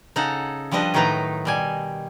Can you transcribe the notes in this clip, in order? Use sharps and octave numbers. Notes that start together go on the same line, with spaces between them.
C#3 D#4 G#4 A4 F#5
F3 G3 D4 B4 D#5
A2 D#3 F#3 D#4 B4 A#5
B2 G3 G#5